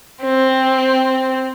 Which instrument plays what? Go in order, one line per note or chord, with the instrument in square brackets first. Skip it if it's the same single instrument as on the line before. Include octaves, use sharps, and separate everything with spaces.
[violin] C4